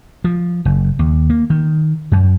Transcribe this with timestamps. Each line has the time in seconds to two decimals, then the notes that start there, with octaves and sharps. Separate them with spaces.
0.24 F3
0.65 F#1
0.99 D#2
1.30 A#3
1.50 D#3
2.12 F#2